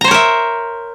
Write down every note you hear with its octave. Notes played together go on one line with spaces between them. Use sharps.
A#4 C5 C#5 E5 A#5